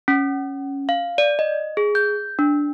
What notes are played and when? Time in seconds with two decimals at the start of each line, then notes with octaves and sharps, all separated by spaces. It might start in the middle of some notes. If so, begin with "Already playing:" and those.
0.08 C#4
0.89 F5
1.18 D5
1.39 D#5
1.77 G#4
1.95 G6
2.39 D4